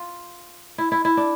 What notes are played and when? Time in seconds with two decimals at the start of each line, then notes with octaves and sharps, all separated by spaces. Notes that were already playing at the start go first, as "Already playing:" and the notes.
Already playing: F4
0.78 E4
0.92 E4
1.05 E4
1.17 D4